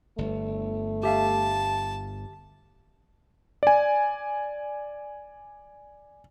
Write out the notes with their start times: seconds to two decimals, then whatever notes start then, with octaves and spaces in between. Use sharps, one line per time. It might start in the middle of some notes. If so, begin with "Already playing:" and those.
0.18 G1 A3
1.03 G4 E5 F5 A5
3.63 D5 G#5